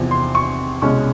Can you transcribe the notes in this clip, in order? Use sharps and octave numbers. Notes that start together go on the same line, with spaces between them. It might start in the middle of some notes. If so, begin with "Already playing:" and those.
Already playing: E2 C3 F3
C6
C#6
C2 B2 G#3 C#4 C#6